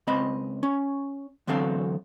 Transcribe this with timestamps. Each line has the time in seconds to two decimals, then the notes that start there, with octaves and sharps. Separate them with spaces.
0.07 C#2 C4 D#5 B5
0.63 C#4
1.47 E2 D3 F#3 C4 A4 F5